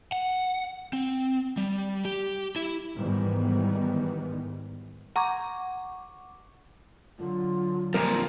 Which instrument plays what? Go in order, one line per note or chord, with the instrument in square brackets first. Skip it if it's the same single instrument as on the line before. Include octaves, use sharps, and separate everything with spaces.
[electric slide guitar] F#5
C4
G3
G4
E4
[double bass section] G#2 D#3 E3 G3 B3
[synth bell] F#5 C#6 D6 [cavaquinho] A#5
[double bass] D3 F#3 [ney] F4
[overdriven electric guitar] F2 A#2 [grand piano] G3 G4 A#4